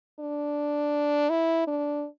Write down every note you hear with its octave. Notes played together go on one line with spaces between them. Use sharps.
D4
E4
D4